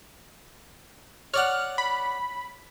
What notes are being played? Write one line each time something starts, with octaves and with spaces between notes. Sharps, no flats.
C#5 D5 F#5 F6
B5